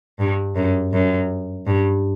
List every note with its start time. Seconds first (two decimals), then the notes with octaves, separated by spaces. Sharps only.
0.19 G2
0.56 F#2
0.93 F#2
1.67 G2